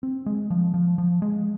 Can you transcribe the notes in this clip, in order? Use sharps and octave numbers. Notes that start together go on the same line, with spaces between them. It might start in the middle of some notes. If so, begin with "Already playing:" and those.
C4
G#3
F3
F3
F3
G#3